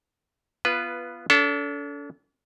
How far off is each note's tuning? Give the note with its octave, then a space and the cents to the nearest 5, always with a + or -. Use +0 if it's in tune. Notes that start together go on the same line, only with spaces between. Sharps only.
B3 -10 F4 -20 B4 +0
D4 -45 A4 +0